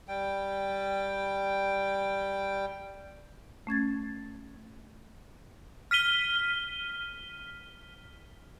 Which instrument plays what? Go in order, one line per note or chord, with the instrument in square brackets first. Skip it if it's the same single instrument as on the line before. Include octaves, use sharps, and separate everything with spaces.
[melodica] G3 G5
[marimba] A3 C#4 G#6 A6
[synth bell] F6 B6 D#7 G7